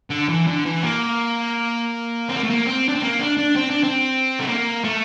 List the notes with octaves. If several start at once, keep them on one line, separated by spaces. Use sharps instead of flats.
D3
E3
D3
E3
A#3
C4
A#3
A3
A#3
C4
D4
C4
A#3
D4
D4
C4
D4
C4
A3
A#3
A3